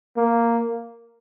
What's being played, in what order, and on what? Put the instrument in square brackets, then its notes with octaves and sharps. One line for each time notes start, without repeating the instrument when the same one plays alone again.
[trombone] A#3